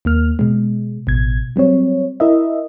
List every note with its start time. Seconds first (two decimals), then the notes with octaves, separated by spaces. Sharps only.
0.05 D#2 A#3 F6
0.39 B2 G#3
1.07 A1 B2 G#6
1.56 F#3 G3 C4 C#5
2.20 E4 A#4 D#5 E5